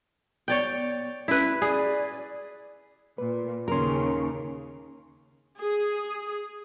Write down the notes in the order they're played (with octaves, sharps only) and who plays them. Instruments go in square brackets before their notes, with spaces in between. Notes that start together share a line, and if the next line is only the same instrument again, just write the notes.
[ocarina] B3 [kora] C#5 D5 G5
[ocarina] C#4 [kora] E4 B4
[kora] G#4 [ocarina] D5
[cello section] A#2 [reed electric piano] B4
[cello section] D#2 C#3 [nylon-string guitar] C#4 A#4 [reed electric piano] A#5 C6
[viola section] G#4